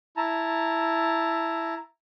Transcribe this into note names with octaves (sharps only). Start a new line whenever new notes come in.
E4 A5 A#5